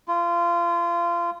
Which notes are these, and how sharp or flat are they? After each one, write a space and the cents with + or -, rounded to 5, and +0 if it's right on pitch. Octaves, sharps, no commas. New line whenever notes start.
F4 -25